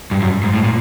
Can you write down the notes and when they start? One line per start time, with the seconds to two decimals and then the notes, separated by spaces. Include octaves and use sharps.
0.11 G2
0.22 F#2
0.43 G#2
0.54 A2
0.64 A#2